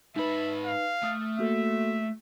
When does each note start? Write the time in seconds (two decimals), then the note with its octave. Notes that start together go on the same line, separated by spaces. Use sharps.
0.16 G#2 D#4 B4 E5 B5
0.66 F5
1.04 A3 D#6 F6
1.39 A#3 F#4 A4 E5